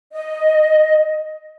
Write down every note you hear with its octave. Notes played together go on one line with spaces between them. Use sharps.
D#5